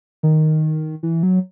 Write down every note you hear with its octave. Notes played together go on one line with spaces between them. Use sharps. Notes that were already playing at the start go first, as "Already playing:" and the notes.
D#3
E3
F#3